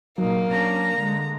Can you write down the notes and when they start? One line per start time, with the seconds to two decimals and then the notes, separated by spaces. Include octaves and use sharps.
0.18 A#2 F#3 A#3 D#4
0.51 C#4 D4 A#5
0.95 D3 G#3